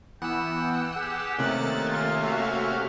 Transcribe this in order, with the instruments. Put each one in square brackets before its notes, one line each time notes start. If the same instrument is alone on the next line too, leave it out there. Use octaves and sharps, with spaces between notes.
[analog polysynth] E3 B3 [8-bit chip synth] F#5 E6 [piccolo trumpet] G5
[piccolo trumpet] G4 [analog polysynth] G#4
[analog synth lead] C3 [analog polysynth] D#3 A6 [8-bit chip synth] A3 A#3 C#4 [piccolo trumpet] F#6
[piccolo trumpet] F4
[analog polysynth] F#4 F5 [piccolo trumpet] E5